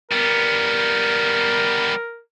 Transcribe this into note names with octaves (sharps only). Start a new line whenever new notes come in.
G3 B3 A#4